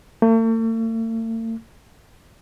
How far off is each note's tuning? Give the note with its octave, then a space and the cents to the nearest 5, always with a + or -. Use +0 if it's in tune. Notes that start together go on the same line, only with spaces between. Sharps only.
A3 +45